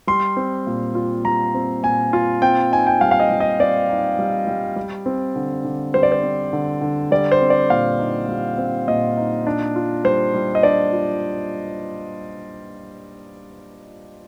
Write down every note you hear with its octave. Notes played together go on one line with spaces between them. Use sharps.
G3 C6
C4
A#2
F4
G3 A#5
C4
A#2 G#5
F4
C4 G5
D#4 G#5
G5
G3 F5
F5
D#5
G3
D#5
C4 D5
D#4
G3
G3
G3
C4
D3
D3
G3 C5
D5
C5
C4
D3
D3
G3 D5
C5
C4
D5
A#2 F5
D#4
G3
C4
A#2 D#5
D#4
D4
F4
G3 C5
G3
D#5
D4 D5
F4